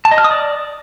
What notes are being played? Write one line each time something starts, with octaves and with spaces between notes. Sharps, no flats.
A5
D#5
F6
D#6
D5